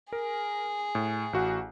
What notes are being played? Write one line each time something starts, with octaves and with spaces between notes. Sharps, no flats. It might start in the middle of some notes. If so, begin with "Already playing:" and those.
G#4 A#4
A2
A1 F#4 F#5